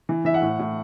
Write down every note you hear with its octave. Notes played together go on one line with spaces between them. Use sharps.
E3
E3 E5
F#5
A2
A2